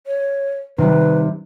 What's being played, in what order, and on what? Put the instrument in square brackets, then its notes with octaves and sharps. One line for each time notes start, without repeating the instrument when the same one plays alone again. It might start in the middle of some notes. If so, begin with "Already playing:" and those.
[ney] C#5
[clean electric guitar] C2 D#3 [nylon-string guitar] C3 G3 [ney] B4